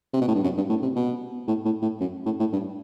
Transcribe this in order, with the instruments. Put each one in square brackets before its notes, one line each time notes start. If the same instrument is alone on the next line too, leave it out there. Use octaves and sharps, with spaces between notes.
[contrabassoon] C3
B2
A2
G2
F#2
G2
A2
C3
B2
A2
A2
A2
F#2
A2
A2
G2